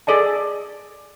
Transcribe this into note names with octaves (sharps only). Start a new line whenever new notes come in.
G#4 A4 D5 D#5 A5